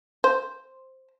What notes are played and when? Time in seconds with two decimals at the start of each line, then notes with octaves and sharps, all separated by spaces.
0.24 C5